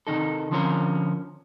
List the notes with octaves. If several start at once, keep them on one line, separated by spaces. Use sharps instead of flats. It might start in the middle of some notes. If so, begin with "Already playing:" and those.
C3 D#3 D#4 A4
D3 F3 C4 C#4 F4 A#4